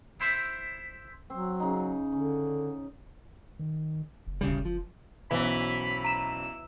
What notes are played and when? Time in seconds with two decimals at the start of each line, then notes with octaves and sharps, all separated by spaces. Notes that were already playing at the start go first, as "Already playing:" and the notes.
0.21 E4 C5 E5
1.30 F#3 C4
1.60 C#3 D#4
2.12 D3 C#4
3.59 D#3
4.27 F#1
4.41 D1 C#3 G3
4.65 F3
5.31 B1 F#2 E3 C5 B5
6.04 A#5 E7